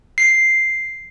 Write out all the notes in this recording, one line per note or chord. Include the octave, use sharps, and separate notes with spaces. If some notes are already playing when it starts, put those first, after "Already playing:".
C7